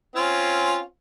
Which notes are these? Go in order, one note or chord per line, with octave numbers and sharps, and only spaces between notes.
C4 C#4 F4